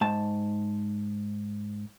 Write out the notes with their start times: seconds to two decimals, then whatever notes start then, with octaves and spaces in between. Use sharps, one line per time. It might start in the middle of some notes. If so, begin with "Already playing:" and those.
0.01 G#2 A5